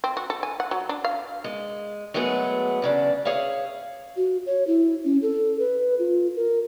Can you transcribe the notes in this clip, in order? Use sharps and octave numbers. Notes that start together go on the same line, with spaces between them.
C4
F#4
A4
G#5
F#5
F#3
D4
F5
G#3
F#3 G#3 A3 B3 G#4
E2 C#3 D4
G#4 C#5 E5 F5
F#4
C#5
E4
C#4
A4
B4
F4
A#4